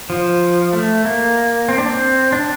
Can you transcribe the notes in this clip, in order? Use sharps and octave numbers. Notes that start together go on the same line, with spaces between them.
F3
A3
A#3
C4
D4
C4
D4